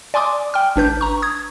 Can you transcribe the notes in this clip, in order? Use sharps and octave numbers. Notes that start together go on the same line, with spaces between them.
D5 G#5 C6 D6 D#6
G5 F6
G#1 D4 B4 G6
A#5 C#6
D#6 G#6